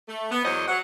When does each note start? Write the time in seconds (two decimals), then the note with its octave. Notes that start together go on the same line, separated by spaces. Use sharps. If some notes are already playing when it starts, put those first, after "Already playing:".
0.08 A3
0.31 B3
0.45 E2 F#3 G#3 C5 C#5 D#5
0.68 F#3 F#5